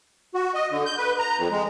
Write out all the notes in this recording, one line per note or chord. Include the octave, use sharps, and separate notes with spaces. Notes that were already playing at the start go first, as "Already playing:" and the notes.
F#4
D#5
D3
G6
B4
A#5
F2
G#3